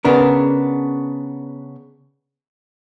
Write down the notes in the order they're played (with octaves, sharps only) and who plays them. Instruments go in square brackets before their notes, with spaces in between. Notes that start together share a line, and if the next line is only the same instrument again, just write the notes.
[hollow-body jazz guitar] C#3 B3 D4 A#4